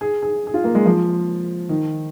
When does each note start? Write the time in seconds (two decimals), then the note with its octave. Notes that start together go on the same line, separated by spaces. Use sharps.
0.01 G#4
0.22 G#4
0.47 G#4
0.54 F4
0.64 A#3
0.75 G#3
0.86 F3
1.69 D#3